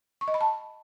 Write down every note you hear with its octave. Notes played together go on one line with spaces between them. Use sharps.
C#6
D#5
B5
A5